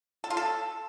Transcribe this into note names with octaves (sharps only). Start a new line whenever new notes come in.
A4
F4
A4